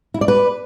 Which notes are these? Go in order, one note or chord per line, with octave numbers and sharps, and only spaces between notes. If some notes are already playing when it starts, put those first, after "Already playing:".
E4
D5
B4